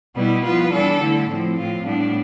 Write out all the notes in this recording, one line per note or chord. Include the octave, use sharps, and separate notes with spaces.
B2 G3 B3 E4
F3 B3 F4 B4
E3 G3 D4 A4
D3 A3 E4
A2 F3 C4
A2 F3 C4 F4
A2 G3 B3 D4